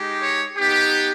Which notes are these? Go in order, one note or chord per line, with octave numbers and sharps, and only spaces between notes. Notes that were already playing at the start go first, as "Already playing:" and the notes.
Already playing: G#3 D#4 G4
C#5
B3 D#4 G4